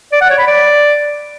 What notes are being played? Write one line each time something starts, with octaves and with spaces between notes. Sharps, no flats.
D5
F#5
C#5
B5
D5